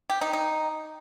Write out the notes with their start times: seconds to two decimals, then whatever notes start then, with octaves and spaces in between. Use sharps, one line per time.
0.10 G4
0.21 D#4
0.33 D#4